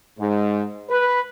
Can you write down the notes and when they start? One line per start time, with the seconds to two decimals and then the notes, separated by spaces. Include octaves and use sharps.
0.18 G#2
0.89 B4